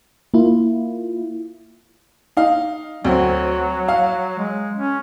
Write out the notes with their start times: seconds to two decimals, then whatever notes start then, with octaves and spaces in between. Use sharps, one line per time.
0.34 A#3 E4 F4
2.37 D#4 F5
3.05 D2 F#3 C4
3.88 F5
4.38 G#3
4.76 C#4